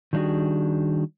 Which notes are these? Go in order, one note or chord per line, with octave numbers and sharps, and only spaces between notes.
D#3 G3 D4 D#4 F#4 G#4